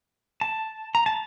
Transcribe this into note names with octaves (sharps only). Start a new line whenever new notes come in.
A5
A#5
A5